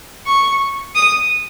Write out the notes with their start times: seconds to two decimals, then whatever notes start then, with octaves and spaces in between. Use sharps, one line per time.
0.27 C#6
0.95 D#6